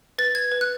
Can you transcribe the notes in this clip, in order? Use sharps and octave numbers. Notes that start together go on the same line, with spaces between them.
B4 A6
G#6
B4
F#6